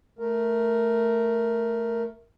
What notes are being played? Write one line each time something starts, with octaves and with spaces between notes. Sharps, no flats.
A3 A#4